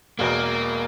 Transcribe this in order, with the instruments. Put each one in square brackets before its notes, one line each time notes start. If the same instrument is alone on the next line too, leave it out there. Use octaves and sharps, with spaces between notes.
[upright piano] E1 E2 B2 [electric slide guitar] A#3